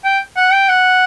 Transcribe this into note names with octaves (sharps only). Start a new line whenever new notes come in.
G5
F#5
G5
F#5